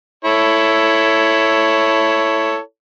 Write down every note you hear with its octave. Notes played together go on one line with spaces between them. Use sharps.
E4 A4 C#5